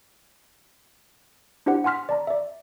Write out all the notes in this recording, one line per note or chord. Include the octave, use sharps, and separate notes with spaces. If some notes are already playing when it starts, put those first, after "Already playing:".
D4 E4 G4 C5 F#5
F#5 G#5 C6 F6 B6
D5 A5 A#5
D5 E5